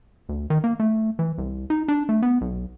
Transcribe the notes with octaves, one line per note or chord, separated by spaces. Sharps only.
D2
D#3
A#3
A3
E3
C2
D#4
D4
A3
B3
B1